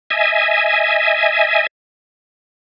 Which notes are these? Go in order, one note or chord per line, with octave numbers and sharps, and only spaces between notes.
D#5 E5 G#5